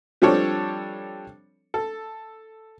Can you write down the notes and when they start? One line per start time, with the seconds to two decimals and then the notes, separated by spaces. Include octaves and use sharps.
0.22 F3 G3 C4 D4 A4 C#5
1.74 A4